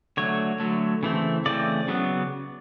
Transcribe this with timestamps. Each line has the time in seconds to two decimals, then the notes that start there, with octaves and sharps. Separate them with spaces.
0.17 D3 F#3 A3 C#5
0.60 D3 F#3 A3
1.03 C#3 E3 A3 C4
1.46 C#3 E3 A3 C4 D5
1.88 C#3 F#3 B3